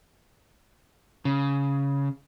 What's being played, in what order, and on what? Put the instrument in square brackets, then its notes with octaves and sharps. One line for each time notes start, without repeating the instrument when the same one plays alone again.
[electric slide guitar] C#3